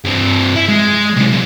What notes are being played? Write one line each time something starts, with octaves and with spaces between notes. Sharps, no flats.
G2 C4
E4
G#3
B1 C3